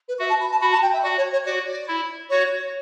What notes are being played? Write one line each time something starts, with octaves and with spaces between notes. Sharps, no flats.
B4
F#4 E5
A5
B5
A5
F#4 B5
A5
G5
E5
F#4 D5
C#5
C#5
F#4 D5
D5
E4
F#4 C#5